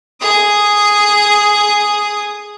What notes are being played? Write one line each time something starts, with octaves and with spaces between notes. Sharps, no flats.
G#4 D#6